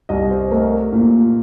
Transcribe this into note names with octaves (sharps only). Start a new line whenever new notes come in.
C2 D#5
C5
A3 A#4
A#2